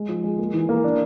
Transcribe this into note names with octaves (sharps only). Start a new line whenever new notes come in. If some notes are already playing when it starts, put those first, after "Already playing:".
Already playing: G#3
F3
G#3
A#3
E3
A#3
D4